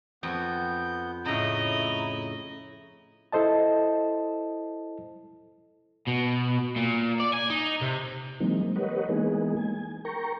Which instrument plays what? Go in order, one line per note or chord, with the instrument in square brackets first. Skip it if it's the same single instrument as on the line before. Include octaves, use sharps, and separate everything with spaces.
[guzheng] F2 G#5 [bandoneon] B3 G6
[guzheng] A2 C#3 [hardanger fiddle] E4 D#5 [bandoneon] A#5
[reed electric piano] E4 A4 C5 D#5 A5
[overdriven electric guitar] B2
A#2
D5
G#5
D#4
C3
[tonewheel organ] E3 F#3 G#3 A#3 C4 D#4
G4 A#4 B4 C#5 D#5 F#5
E3 G#3 A#3 B3 D#4 G#4
G#5
A#4 G5 A#5 C#6